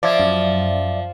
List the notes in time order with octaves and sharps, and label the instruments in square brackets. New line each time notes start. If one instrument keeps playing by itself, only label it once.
[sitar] F3 [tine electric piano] D5 E5 [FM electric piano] D6 G#6
[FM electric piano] F#2